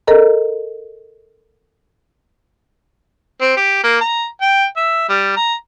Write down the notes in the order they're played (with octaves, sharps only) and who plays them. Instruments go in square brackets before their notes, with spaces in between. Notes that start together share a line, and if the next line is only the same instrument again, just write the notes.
[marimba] A4 A#4 D#5 A#5
[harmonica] C4
G4
A#3
A#5
G5
E5
G3
A#5